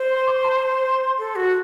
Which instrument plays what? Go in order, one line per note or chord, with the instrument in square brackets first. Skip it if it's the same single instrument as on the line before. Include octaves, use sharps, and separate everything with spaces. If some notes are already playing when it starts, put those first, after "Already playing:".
Already playing: [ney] C5
[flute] C6
D6
C6
A5
C6
[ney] A4
F#4